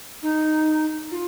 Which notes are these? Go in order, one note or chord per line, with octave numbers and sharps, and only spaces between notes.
D#4
F4